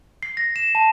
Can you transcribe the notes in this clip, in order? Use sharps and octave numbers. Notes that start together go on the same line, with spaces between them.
C7
A#6
E7
A5